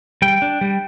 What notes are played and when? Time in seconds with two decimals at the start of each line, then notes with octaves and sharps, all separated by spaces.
0.22 G3 G5
0.42 D4
0.61 G3